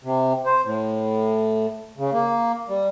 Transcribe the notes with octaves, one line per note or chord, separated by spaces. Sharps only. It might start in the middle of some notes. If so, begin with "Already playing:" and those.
C3
C5
A2
C#3
A#3
G3